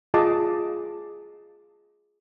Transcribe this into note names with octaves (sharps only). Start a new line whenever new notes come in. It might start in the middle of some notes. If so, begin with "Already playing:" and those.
F4 G#4 D#5 A5 D6 D#6